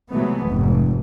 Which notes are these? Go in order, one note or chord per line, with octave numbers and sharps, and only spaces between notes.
C3 E3 F#3 G#3 A3 B3
F1 F2 G#2